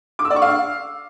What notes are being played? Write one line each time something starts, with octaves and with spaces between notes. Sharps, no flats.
D6
E6
D5
C#6
F5